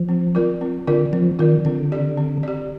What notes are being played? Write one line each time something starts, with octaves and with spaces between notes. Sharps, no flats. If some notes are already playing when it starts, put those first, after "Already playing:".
Already playing: F3
C4
F4 A#4 D5
C4
D3 F4 A#4 D5
F3 C4
D#3 F4 A#4 D5
D3 C4
G4 D5
C4
G4 D5